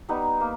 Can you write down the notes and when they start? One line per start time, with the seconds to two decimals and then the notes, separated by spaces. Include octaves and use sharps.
0.09 G3 B3 D#4
0.40 A#3